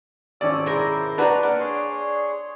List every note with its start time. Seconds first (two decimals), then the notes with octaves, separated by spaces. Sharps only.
0.41 G#1 C#4 D5 D#6 E6
0.66 G#3 E4 A#4 C5
1.18 D4 D#4 F#4 B4 A#5
1.43 A#3 D5 F#5
1.60 G#4 C#5 C6